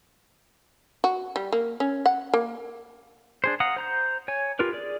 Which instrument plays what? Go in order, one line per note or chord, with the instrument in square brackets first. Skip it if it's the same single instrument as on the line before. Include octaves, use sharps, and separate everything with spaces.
[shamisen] F#4
G3
A#3
C#4
F#5
A#3
[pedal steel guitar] D4 G#4 C5
F5 F#5 A#5 D#6
C5 A#5 G6
C#5 G#5
F4 G4 A#4 B4
G#4 D5